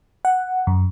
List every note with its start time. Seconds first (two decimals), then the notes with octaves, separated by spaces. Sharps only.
0.25 F#5
0.67 F#2